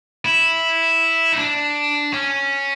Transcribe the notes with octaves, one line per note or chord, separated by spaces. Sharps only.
E4
D#4
D4
C#4